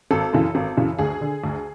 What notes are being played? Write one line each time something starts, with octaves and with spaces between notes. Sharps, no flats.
G#1 A4
F#2 C#3 E3
G#1
F#2 C#3 E3
D2 G#4
D3
D2